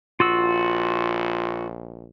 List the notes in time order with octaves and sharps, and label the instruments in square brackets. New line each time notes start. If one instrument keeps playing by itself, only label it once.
[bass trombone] A#1 [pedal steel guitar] F4 F#4 E6